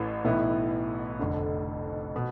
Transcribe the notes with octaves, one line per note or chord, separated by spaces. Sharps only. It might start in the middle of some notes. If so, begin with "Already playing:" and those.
Already playing: A1 A2 E3
B1 A2 E3 B3 E4
F1 F2 D3
B2